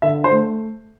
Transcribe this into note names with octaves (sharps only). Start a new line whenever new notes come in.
D3 E5
C5
A3